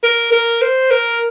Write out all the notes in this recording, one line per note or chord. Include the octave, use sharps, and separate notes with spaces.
A#4
A#4
C5
A#4